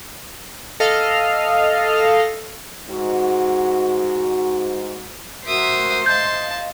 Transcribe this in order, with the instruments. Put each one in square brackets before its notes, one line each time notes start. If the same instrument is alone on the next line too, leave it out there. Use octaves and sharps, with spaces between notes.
[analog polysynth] A4 D#5 F5 F6
[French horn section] G#2 F#4
[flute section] F#4 A#4 [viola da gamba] C5 [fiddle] E5 D#6
[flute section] D#5 F5 [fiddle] A5 C6 [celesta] G6